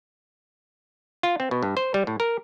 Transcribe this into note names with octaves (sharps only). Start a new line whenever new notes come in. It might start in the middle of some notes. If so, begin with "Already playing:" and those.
F4
C4
B2
G2
C5
G3
A2
A#4